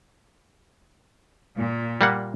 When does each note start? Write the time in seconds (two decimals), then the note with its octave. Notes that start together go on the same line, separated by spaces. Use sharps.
1.57 A#2
2.01 G3 A#3 F#5